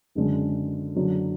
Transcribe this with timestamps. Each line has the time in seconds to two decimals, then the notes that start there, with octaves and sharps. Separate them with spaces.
0.15 F#1 F#2 D3 G#3
0.95 F#1 F#2 D3 F#3